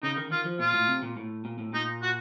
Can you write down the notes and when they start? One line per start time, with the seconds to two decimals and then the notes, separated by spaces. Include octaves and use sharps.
0.03 C#3 D#4
0.16 D#3
0.31 D#3 F4
0.45 F3
0.59 A#2 F4
0.74 A2
0.88 C3
1.03 A#2
1.17 A2
1.45 A#2
1.59 A2
1.73 A#2 D#4
2.02 F#4